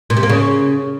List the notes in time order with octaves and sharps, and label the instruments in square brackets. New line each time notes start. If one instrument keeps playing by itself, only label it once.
[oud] A#2
C3
A#3
C#3